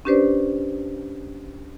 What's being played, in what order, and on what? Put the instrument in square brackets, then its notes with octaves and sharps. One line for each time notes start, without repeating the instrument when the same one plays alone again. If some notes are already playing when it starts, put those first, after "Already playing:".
[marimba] C#4 D4 G4 B4 C5 D5